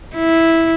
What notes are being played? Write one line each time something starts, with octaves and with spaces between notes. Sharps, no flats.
E4